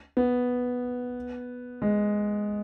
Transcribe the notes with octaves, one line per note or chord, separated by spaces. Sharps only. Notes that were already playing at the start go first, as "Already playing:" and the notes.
B3
G#3